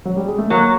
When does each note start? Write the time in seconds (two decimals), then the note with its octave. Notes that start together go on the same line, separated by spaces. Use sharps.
0.05 F#3
0.16 G3
0.28 G#3
0.38 A3
0.50 F#3 A#3